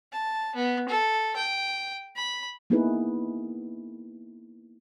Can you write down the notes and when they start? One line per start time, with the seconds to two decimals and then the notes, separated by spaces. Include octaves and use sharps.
0.12 A5
0.56 B3
0.89 A4
1.36 G5
2.16 B5
2.70 A#3 B3 D#4 E4 G#4 B4